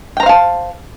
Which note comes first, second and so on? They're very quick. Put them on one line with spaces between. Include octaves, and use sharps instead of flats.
G5 A#5 C5 F5 A5